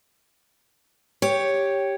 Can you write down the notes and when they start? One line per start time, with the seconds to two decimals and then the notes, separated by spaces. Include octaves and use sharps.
1.22 G4 C#5